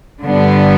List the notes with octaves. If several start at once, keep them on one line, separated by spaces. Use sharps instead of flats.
G2 D3 G3 B3 D4